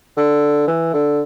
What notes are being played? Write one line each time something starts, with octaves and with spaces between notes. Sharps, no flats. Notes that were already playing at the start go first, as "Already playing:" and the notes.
D3
E3
D3